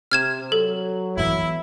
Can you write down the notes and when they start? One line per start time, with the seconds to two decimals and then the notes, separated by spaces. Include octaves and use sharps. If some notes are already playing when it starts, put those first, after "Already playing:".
0.12 C3 F6 G#6 E7
0.52 F#3 A4
1.17 E3 B3 E4